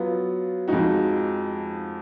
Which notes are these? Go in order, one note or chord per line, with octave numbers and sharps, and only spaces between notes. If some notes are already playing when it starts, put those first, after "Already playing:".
Already playing: F#3 B3 F4
F2 F3 G#3 D#4 F#4